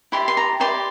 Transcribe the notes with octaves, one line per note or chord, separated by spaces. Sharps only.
E4 G4 D5 C6
C6
A#5
E4 G4 D5 C6